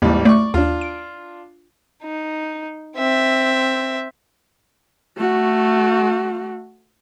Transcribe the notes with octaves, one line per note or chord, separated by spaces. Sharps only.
A1 D#2 G#2 G3
A3 D5 C#6
D#2 D4 F4
D7
D#4
C4 E5
A3 F#4